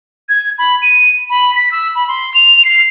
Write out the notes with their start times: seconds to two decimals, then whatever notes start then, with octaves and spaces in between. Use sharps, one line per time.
0.29 G#6
0.59 B5
0.82 D#7
1.30 B5
1.55 B6
1.72 E6
1.95 B5
2.08 C6
2.34 F7
2.65 C7